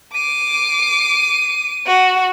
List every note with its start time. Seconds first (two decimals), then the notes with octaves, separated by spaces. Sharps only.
0.14 D6 C7 D#7
1.86 F#4